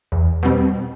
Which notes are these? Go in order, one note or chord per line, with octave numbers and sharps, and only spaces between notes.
E2
B2 G3 C4